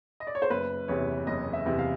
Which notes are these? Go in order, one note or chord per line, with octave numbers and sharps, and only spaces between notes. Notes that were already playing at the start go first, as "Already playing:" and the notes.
D#5
D5
C#5
C5
F#1 B4
E2 C3 C#5
F#1 D#5
E5
E2 C3
F5